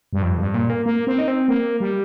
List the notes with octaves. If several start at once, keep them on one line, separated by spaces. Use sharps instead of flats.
G2
F2
G2
A#2
A#3
A#3
C4
D#4
C4
A#3
G3